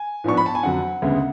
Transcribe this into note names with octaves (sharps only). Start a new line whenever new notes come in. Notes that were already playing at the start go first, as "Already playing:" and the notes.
Already playing: G#5
G#2 F3 B3 D4 C#6
B5
A5
G#5
F2 D3 F#3 F#5
D2 C#3 G#3 B3